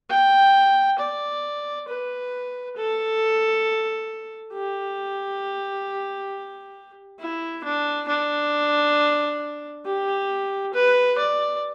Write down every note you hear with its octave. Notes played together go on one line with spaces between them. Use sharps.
G5
D5
B4
A4
G4
E4
D4
D4
G4
B4
D5